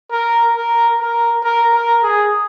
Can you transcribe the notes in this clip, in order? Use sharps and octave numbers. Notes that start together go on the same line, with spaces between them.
A#4
A#4
A#4
A#4
A#4
G#4